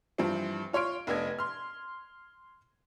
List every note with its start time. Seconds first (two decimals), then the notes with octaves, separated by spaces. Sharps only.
0.18 G2 E3 F3 C4
0.73 F4 C#5 C6 F6 D7
1.07 F1 B3 D4 D#5 G#6
1.39 C6 F6